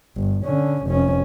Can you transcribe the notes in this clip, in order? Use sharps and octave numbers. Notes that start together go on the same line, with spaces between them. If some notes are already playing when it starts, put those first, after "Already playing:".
G1
D3 C#4
F1 C#4